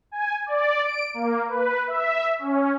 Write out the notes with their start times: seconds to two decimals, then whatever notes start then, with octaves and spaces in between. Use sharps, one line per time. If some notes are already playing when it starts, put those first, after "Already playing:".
0.11 G#5
0.46 D5
0.84 D7
1.14 A#3
1.49 B4
1.87 E5
2.39 C#4